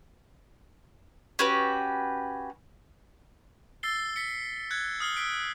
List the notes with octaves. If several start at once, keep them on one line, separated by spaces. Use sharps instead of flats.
C#4 F#4 G4 B4
E6 A6 C7 G7
B6 C#7
F#6 G#6 C#7
D#6 F6 C7 G7
E6 B6 D7